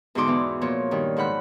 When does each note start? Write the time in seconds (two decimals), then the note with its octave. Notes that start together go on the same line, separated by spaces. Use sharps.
0.15 E2 G#2 D3 F#4 C6 D6
0.27 E3 B3
0.61 A#2 F3 C#5
0.91 G2 D#3
1.17 G#2 F3 F#5 B5 F#6